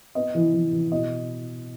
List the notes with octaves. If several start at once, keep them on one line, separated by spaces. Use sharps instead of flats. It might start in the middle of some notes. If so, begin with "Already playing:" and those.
B3 D#5
E3
E3
E3
B2 D#5